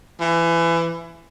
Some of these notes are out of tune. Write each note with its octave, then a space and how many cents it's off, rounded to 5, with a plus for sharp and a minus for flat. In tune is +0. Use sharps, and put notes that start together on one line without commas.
E3 +25